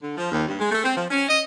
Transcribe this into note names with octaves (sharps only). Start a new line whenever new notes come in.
D3
F3
D#2
G2
G#3
A3
C4
F3
C#4
D#5